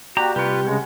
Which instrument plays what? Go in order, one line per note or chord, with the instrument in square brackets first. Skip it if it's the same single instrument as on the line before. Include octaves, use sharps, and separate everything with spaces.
[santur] G3 A#3 D5 [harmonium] F#4 [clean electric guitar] G4 [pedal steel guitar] A#5
[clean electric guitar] C2 [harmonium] F4 B4 [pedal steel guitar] G4 [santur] A#4 B5 C#6
[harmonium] C#3 G#3 [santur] F#5 G#5